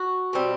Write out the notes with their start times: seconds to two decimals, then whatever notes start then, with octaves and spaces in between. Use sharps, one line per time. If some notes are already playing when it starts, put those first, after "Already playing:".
Already playing: F#4
0.33 B2 G3 C4